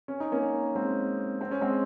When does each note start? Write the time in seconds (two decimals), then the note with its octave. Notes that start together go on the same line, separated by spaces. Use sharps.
0.08 C#4
0.20 D#4
0.32 A#3 C#4
0.75 G#3 C4
1.41 C4
1.51 C#4
1.61 G#3 C4